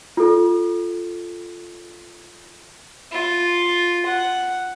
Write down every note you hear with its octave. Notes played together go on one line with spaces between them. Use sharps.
F4 A4
F4
F#5